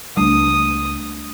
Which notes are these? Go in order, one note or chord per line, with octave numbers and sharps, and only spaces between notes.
C#2 G3 A3 D4 D#6